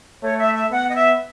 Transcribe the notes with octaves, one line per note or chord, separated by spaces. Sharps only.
A3 C#5
E5
E5
B3 F#5
D#5
E5